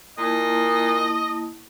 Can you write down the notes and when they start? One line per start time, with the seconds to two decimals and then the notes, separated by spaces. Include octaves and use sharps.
0.18 A#2 A#3 E4 D#5 A5